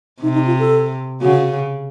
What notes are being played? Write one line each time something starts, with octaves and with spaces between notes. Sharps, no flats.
C3 D#4
D#4
F4
A4
C#3 F#4